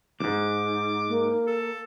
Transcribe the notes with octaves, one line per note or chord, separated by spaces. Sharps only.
E2 G#2 D6
A#3
A4